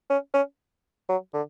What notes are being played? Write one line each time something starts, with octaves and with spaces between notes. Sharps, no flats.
C#4
C#4
F#3
D3